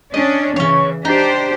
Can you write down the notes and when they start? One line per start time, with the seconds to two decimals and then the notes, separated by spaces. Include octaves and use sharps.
0.14 C#4 D4 D#5
0.56 C#3 E3 C#4 C#5
1.05 D4 D#4 G4 C5